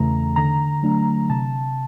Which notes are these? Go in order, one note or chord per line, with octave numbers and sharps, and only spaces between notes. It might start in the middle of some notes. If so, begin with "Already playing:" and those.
Already playing: E2 C#3 E3 A3 A#5
D3 A#5
F#3 A3 D4
C3 A5